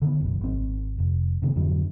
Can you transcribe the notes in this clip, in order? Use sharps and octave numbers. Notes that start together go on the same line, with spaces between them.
D3 D#3 A#3 B3
F#1 B1
G#1 C4
F1
C3 D#3 B3
F2 G#2 D3 F#3